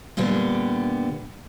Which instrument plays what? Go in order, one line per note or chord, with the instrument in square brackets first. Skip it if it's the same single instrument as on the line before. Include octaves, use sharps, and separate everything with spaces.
[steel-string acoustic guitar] A#2 D3 G3 B3